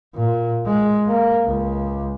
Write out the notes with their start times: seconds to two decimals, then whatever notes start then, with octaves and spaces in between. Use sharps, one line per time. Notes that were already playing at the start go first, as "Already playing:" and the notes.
0.16 A#2
0.66 G#3
1.07 A#3
1.46 C#2